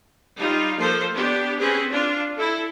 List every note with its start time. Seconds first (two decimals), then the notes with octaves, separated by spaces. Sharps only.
0.37 G3 D#4 F4
0.78 F3 A#3 A4 C5
1.14 B3 D4 G4
1.58 C4 C#4 G#4 B4
1.89 D4 F4
2.36 E4 A4